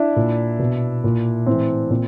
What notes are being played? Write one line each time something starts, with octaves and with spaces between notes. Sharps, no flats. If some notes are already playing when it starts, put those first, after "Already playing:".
Already playing: D4 E4
A#2
B2
A#2
A2 E3 C4
A#2 C4